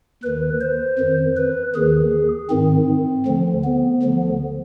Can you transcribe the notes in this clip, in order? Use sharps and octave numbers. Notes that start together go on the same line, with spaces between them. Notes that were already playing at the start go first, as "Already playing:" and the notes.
D#2 D#3 B4
C5
F2 D#3
B4
D#2 D#3 G#4
G#2 D#3 C4
D2 D3 F3
B3
D2 D3 F3